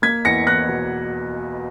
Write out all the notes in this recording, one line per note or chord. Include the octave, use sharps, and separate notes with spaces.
A#3 G#6 B6
E2 A#6 C#7
E2 F#6 A#6
B2